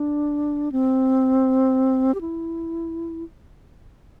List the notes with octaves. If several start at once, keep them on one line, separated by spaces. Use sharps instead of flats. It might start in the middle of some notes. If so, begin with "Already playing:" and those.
Already playing: D4
C4
G4
E4